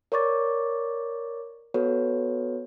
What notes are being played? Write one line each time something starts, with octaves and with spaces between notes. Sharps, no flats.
A#4 C#5 D5 C#6 D6 A6
B3 F#4 A4 B4 C#5